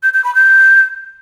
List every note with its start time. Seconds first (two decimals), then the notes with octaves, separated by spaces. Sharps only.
0.03 G6
0.14 G6
0.24 B5
0.35 G6